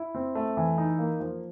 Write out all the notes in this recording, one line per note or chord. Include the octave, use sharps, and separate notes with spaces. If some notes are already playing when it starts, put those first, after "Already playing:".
Already playing: E4
C4
A3
E3
D#4
A#3
F3